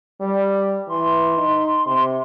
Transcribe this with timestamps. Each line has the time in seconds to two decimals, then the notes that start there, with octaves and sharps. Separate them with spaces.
0.21 G3
0.89 E3 C6
1.37 D#4
1.87 C3